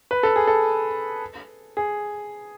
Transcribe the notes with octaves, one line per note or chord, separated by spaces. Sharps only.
B4
A4
G#4
A4
G#4